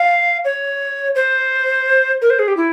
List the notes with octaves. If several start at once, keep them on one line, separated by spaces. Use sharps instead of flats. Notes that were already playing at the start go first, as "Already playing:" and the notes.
Already playing: F5
C#5
C5
A#4
C5
G#4
G4
E4